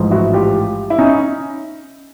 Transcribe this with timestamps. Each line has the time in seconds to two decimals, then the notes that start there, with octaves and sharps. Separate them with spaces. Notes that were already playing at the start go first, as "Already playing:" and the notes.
Already playing: A1 G#2 F3
0.11 E4 F#4
0.33 F4 G4
0.90 E4
0.99 C#4 D#4